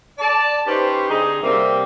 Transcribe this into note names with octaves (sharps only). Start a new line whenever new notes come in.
D5 A5
C#4 D#4 G4 B4 C5
D3 C4 D#4 G#4
C3 G3 A#3 C4 A#4 E5